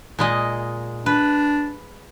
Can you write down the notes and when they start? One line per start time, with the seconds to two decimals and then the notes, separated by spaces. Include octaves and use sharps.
0.19 A#2 G#3 D#5
1.06 D4 B4